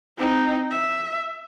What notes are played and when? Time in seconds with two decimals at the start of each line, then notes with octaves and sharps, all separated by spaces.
0.17 C4 D#4
0.71 E5